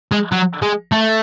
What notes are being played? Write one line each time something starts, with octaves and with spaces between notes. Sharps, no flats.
G#3
F#3
G#3
A3